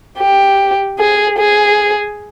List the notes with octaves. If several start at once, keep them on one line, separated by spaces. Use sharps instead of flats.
G4
G#4
G#4